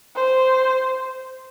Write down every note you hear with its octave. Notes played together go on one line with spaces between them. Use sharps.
C5